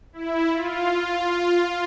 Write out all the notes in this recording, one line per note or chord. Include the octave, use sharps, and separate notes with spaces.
E4
F4